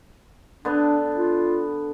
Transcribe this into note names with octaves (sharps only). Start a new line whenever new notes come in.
D3 B3 D4
F4